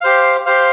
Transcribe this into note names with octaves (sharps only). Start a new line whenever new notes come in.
G4 C5 F5
G4 C5 F5